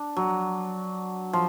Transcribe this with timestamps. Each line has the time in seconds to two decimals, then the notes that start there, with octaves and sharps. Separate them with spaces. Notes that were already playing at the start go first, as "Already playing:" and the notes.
Already playing: D4
0.17 F#3
1.33 F3